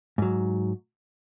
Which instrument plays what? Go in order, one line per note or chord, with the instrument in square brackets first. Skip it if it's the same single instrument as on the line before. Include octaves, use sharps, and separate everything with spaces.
[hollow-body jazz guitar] G#2 F#3